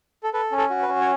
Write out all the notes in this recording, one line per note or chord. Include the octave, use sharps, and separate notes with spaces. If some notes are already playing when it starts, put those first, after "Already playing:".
A4
A4 B4
C#4
A4
F#4
B4
C#4
C#5